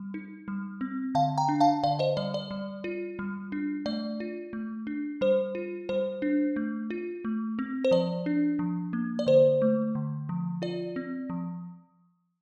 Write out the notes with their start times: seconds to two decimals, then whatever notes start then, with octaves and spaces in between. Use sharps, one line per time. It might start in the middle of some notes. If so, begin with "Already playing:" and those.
Already playing: G3
0.14 D#4
0.48 G3
0.81 C4
1.15 D3 F5 A5
1.38 G5 A#5
1.49 D4
1.60 F5 A5
1.84 D3 D5 F5
1.99 C5 D#5
2.17 G3 D5
2.34 D5
2.51 G3
2.84 F4
3.19 G3
3.52 D4
3.86 A3 D5
4.20 F4
4.53 A3
4.87 D4
5.21 G3 C5
5.55 F4
5.89 G3 C5
6.22 D4
6.56 A3
6.90 F4
7.25 A3
7.59 C4
7.85 C5
7.91 F3 D5
8.26 D4
8.59 F3
8.93 A#3
9.19 D5
9.27 D3 C5
9.62 A3
9.95 D3
10.29 F3
10.62 F4 D5
10.96 C4
11.30 F3